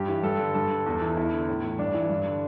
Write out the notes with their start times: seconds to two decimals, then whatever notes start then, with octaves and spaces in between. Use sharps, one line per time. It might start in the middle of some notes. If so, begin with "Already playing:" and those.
Already playing: G2 G4
0.08 E3
0.23 G2 A4
0.40 D3
0.55 G2 A4
0.70 D3
0.86 E2
1.02 E3
1.17 E2 E4
1.32 D3
1.49 A2
1.63 E3
1.79 G2 D4
1.94 E3
2.10 G2
2.25 D3